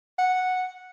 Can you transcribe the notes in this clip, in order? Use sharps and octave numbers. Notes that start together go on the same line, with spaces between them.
F#5